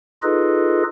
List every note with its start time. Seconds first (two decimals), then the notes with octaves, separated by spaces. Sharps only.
0.23 D#4 F4 G#4 A4 B4 D#5